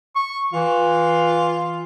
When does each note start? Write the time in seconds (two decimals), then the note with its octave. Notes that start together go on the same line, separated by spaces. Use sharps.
0.15 C#6
0.53 E3 F4